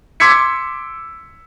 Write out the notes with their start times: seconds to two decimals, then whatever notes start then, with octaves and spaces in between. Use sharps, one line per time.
0.20 C6 D6 E6 G#6 B6 C#7